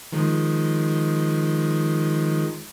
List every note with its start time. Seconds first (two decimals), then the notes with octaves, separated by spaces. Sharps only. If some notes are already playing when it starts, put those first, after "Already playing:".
0.12 D#3 F3 G#3